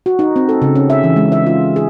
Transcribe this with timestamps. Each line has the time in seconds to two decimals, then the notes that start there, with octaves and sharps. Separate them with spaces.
0.06 F#4
0.19 D#4
0.36 C4
0.49 A4
0.62 C#3
0.75 C#4
0.90 E5
1.03 E3
1.16 G#3
1.32 E5
1.47 F4
1.76 G#4